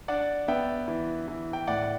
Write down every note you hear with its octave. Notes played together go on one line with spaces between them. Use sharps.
D4 D5 F#5
B3 E5 G5
E3
E3
G5
A2 D5 F#5